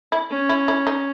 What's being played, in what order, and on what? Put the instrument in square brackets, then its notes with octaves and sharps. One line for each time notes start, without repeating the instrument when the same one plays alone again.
[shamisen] E4
[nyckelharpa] C#4
[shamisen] E4
E4
D#4